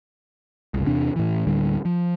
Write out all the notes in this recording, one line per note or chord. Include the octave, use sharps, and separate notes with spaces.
F#1 C2
E2 C3 C4 D4
A2 E3
D2 A2 D3 G3
F3